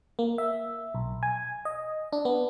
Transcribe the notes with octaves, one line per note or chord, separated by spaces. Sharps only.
A#3
E5
B1
G#5
D#5
D4
B3